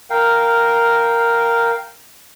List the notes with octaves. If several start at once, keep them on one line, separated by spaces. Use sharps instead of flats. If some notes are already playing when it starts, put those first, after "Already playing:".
A#4 F5 G5